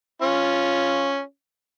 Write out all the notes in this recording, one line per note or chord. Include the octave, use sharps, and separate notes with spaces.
C#4 F4